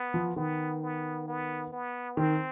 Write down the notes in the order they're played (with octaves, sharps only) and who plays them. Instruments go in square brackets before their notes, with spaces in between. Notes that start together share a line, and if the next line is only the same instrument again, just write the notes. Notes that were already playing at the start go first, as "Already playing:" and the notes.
Already playing: [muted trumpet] B3
[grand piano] F3
[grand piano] D#3 [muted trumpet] B3
[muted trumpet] B3
B3
B3
[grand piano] D#3 [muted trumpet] C4